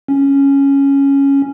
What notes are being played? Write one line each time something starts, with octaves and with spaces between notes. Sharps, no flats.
C#4